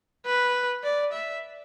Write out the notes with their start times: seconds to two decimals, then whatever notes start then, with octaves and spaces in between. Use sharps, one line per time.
0.26 B4
0.84 D5
1.13 E5